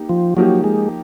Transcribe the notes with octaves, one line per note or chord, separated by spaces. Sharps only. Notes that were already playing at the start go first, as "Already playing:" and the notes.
Already playing: A#3 D#4 G4
F3
F3 F#3 A#3 D#4 G4
G#3